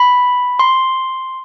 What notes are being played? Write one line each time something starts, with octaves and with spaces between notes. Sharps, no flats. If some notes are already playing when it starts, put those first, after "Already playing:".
Already playing: B5
C6